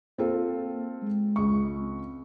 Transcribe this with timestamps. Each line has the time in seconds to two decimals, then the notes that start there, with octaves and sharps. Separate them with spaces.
0.18 A#3 C4 F4 A4
1.02 G#3
1.36 C#2 C#6
1.78 C4